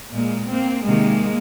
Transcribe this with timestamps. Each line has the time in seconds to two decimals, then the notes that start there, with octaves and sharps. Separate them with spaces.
0.13 A#2 G#3 A#3
0.50 A#3 C4
0.85 C3 D#3 G#3 A#3